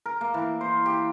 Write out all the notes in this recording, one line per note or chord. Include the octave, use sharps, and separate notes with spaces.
A#4
A#3
E3
C5
G4